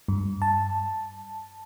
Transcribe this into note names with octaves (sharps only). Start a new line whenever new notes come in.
G2
A5